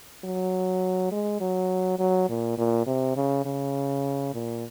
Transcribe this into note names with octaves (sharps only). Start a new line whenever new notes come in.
F#3
G#3
F#3
F#3
A#2
A#2
C3
C#3
C#3
A#2